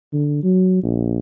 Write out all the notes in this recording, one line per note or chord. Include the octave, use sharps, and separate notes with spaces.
D3
F#3
A#1